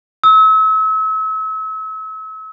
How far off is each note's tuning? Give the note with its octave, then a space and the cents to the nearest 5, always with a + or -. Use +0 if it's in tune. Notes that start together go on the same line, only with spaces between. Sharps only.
E6 -35